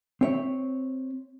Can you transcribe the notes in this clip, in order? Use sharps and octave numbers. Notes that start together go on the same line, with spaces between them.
C4 C#5 E5